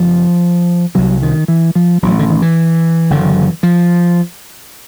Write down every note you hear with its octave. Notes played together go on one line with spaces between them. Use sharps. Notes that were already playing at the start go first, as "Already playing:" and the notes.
Already playing: F#1 F3
C2 C3 F#3
D#3
E3
F3
A1 A2 F#3
D3
D#3
E3
F#1 F#2 D3
F3